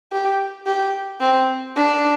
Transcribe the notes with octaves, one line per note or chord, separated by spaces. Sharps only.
G4
G4
C4
D4